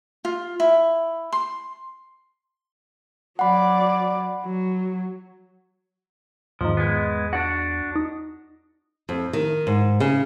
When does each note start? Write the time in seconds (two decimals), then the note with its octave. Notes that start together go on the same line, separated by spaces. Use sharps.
0.25 F4
0.60 E4
1.33 C6
3.39 F#3 D5 F#5 B5
4.45 F#3
6.61 E2 G#2 D#3 F3
6.77 G#3 B3
7.33 D4 F#4 F#5
7.96 D#4
9.09 F2
9.33 D#3
9.67 G#2
10.00 C#3